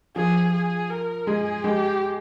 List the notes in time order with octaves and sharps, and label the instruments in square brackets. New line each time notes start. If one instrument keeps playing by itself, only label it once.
[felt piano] F3 [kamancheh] G#4
[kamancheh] G#4
A#4
[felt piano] G#3 [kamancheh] G#4
[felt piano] G#3 [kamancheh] G4